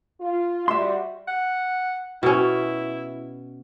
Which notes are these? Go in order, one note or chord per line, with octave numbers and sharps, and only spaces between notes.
F4
G3 F#4 E5 C6
F#5
B2 C#4 E4